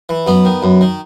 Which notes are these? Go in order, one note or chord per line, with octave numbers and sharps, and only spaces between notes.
E3
F#2 B3
D#3
F#2
D#3